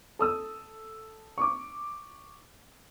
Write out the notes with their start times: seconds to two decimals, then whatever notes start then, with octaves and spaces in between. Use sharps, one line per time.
0.19 A4 D#6 E6
1.38 C#6 D6